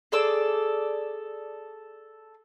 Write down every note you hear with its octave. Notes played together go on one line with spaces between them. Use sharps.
G#4 A4 D5 E6